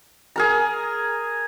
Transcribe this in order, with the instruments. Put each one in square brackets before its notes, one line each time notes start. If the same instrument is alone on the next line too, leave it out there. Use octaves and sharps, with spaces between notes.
[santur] G#4 A#4 A#5